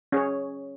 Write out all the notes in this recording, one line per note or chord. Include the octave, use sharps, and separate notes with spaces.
C#4 G#4 C#5